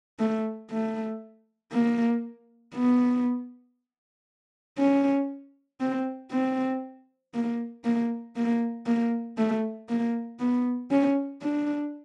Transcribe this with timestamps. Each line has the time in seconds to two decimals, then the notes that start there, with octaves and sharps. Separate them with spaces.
0.20 A3
0.71 A3
1.73 A#3
2.75 B3
4.78 C#4
5.81 C4
6.32 C4
7.34 A#3
7.85 A#3
8.36 A#3
8.86 A#3
9.38 A3
9.89 A#3
10.40 B3
10.91 C#4
11.42 D4